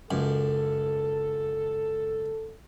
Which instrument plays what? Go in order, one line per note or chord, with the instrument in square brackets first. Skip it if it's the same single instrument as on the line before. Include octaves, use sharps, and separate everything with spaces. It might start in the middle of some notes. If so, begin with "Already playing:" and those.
[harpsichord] C#2 F#2 [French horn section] A4